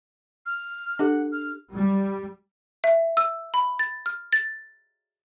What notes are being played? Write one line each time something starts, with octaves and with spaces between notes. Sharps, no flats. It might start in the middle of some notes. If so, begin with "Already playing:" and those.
F6
D4 G4 A4 F#5
F6
G3
E5
E6
B5
A6
F6
A6